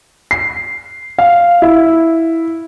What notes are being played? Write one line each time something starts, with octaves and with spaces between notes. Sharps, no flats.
C7
F5
E4